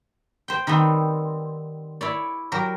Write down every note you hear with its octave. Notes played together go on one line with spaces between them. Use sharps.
C5 G5
D#3 G3 B3 C4
E4 C#5 D5
F#3 G4 A#4